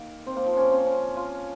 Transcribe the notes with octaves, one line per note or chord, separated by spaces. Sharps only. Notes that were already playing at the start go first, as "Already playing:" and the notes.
Already playing: D#3 A#3
C4
A#3
F3
C#4
C4
C#4
F4